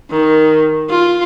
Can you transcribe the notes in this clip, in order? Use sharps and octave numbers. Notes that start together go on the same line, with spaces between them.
D#3
F4